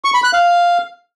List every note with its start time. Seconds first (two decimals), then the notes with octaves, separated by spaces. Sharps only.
0.05 C#6
0.14 B5
0.24 F#6
0.33 F5